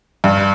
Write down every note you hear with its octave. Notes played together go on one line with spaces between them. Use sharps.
G2